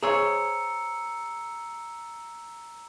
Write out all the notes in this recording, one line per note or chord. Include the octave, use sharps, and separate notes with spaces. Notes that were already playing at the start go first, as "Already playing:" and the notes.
G#4 C5 C#5 A#5 E6 C#7